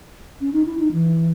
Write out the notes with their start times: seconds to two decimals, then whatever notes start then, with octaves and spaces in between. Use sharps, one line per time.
0.41 C#4
0.53 D#4
0.66 E4
0.79 D#4
0.92 E3